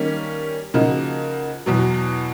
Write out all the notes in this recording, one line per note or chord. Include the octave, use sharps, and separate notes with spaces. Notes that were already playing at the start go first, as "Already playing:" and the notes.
Already playing: D#3 G3 A#3 C#4
C#3 F3 A#3 D#4 F#4
E2 B2 F#3